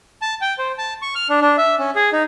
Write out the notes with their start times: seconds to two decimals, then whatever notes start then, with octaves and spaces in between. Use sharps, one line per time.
0.22 A5
0.41 G5
0.58 C5
0.78 A5
1.02 C#6
1.15 F6
1.29 D4
1.41 D4
1.58 E5
1.79 C#4
1.95 G#4
2.13 D#4